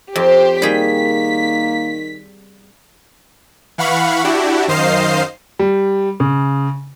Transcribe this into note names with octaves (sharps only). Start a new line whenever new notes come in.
F2 G4 C5
D#3 G3 A#3 G#4 G5 B6
E3 F5 F#5 B5 C#6
D4 E4 F#4 G4
F#2 D#3 C5 D#5 F5 C7
G3
C#3